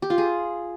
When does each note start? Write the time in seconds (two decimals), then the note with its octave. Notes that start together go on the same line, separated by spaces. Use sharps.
0.02 G4
0.10 F4
0.18 G#4